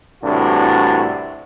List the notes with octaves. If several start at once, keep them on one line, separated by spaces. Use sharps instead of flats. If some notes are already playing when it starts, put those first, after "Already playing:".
C2 A2 E3 D4 F#4